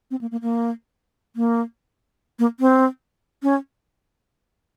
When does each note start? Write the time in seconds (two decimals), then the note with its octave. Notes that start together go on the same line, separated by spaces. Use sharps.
0.11 C4
0.21 A#3
0.31 A#3
0.42 A#3
1.36 A#3
2.39 A#3
2.60 C4
3.43 C#4